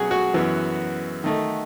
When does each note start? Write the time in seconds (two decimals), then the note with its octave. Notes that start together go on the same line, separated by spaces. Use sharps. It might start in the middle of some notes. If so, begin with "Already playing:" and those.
Already playing: B2 F#3 C#4 F#4 G#4
0.11 F#4
0.34 F#2 E3 B3
1.24 D#3 A3 D#4